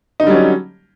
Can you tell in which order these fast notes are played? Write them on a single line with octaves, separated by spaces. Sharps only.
D#4 D3 G3 F#3 C#4